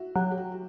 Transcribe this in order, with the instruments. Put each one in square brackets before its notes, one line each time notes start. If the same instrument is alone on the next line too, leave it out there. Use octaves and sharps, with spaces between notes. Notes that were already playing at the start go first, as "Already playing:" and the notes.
Already playing: [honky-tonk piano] E4 F#4
[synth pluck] F#3 [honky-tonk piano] G4
[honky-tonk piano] G4
F#4
F#4